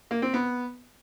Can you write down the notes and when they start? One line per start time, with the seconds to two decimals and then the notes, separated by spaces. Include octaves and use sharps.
0.11 A#3
0.22 C4
0.34 B3